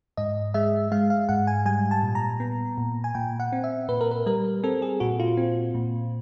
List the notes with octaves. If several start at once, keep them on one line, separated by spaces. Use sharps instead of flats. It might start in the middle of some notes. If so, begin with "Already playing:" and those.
G#2 D#5
G#3 E5
G#3 F5
F5
G#2 F#5
G#5
G3 G#5
A5
A#2
A#5
B3
A#2
G#5
A#2 G5
F#5
C4
E5
A#2 B4
A#4
B4
G3 A#4
C4 A4
G#4
A#2 F#4
F4
C4
A#2